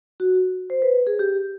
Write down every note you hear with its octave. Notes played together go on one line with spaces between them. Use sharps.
F#4
C5
B4
G#4
G4